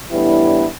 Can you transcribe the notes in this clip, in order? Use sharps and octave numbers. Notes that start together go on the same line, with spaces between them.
A2 E3 G3 B3 D4 E4